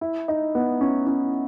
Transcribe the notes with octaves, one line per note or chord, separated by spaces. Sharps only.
E4
D#4
B3
C#4
C#4